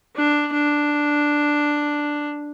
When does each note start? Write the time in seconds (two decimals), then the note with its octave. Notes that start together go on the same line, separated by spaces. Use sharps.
0.16 D4
0.54 D4